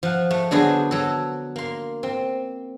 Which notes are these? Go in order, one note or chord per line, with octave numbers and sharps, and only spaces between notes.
F3 F#5
A3
D3 F#3 B3 D4 G#4 C5
F#3 A4
A#3 C6
C4